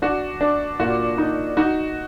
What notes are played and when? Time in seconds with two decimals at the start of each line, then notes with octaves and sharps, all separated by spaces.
0.02 D4 F#4
0.41 D4
0.80 A#2 F#4
1.18 D#4
1.57 D#4 F#4